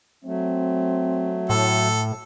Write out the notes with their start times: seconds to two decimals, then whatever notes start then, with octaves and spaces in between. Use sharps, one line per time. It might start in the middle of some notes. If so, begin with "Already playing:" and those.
0.25 F#3 A3 C4
1.50 A2 A4